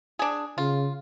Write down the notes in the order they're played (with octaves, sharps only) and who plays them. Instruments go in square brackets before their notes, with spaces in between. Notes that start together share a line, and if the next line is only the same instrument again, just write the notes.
[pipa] D4 G#4
[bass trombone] C#3 [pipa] F4